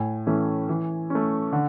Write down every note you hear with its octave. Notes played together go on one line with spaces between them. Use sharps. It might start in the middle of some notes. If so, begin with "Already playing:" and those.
Already playing: A2 G#5
E3 A3 C#4
E3
A3 C#4
D3